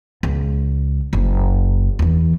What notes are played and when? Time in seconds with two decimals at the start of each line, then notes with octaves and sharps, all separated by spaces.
0.23 C#2
1.13 F#1
1.99 E2 E3